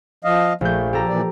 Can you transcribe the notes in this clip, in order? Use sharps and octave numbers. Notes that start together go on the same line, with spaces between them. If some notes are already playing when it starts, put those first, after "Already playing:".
F3 D#5 F5
A#1 A3 G6
G4 A4 A#5
A#2 E3 D5